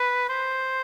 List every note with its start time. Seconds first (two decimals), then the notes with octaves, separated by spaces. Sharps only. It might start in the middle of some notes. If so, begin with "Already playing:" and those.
Already playing: B4
0.29 C5